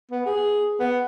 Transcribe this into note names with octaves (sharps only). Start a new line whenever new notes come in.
B3
G#4
B3